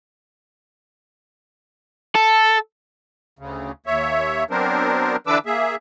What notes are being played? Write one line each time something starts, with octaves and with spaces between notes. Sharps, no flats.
A4
D2 C#3
D#2 C#5 E5
F#3 B3 C4 D4 A#4 C5
D3 E3 D4 B4 D6 E6
A#3 G#4 E5